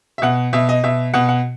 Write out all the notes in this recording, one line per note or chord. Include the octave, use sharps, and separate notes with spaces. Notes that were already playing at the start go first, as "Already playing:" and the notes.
E5
B2 F#5
B2 E5
D#5
B2 E5
B2 F#5
F#5